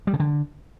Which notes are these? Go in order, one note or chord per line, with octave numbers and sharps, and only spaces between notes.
G3
C#3
D3